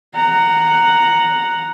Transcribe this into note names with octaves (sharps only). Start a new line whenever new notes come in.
F#5 A#5